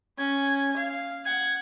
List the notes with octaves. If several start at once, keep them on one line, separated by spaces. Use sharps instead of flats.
C#4 G#6
F5
F#5 G#6